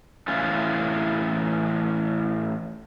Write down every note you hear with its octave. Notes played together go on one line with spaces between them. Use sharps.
A2 E3 C#4 F4